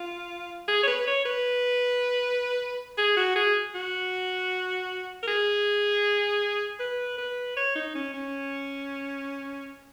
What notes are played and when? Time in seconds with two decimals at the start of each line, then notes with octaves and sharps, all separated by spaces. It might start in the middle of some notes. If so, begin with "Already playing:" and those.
Already playing: F4
0.68 G#4
0.83 C#5
0.88 B4
1.07 C#5
1.25 B4
2.98 G#4
3.16 F#4
3.36 G#4
3.74 F#4
5.23 A#4
5.27 G#4
6.80 B4
7.18 B4
7.57 C#5
7.75 D#4
7.95 C#4
8.14 C#4